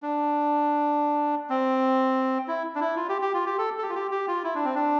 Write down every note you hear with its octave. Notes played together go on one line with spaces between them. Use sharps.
D4
C4
E4
D4
E4
F4
G4
G4
F4
G4
A4
A4
G4
F4
G4
G4
F4
E4
D4
C4
D4